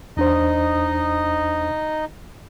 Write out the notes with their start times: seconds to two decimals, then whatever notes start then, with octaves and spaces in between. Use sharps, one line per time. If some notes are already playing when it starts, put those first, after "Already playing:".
0.17 E2 D4 D#4 C5 D#5